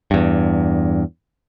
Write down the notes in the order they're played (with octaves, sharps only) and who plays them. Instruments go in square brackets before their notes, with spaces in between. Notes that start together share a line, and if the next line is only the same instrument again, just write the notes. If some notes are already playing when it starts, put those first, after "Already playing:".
[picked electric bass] E2 G2